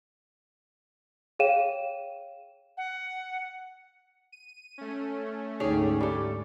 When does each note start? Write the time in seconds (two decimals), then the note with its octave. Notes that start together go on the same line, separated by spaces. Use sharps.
1.39 G#4 C#5 F5 G5 D#7 E7
2.77 F#5
4.32 D#7
4.78 A3 C#4
5.60 D2 G#2 D#4 G4 G#4 C#5
6.01 G3 A4 D6